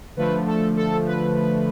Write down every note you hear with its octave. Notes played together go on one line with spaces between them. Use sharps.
D3 F3 A3 B4
A4
A4
B4